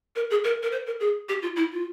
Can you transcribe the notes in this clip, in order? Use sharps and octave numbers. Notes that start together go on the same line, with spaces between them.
A#4
G#4
A#4
A#4
C5
A#4
G#4
G4
F4
E4
F4